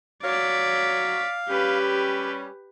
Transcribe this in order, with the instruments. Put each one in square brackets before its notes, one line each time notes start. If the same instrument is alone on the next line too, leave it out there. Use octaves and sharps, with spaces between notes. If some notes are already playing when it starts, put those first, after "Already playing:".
[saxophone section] F#3 C#5 [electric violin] D5 B6 [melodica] F5
[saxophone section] G3 C#4 [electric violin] G4 B4